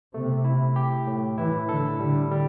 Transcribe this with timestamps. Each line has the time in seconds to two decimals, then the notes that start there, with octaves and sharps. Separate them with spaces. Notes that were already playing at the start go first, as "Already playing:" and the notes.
0.14 C3 A3
0.45 E4
0.76 G4
1.07 A2
1.38 E3 E4
1.69 D3 A4
2.00 D3 G3
2.31 G3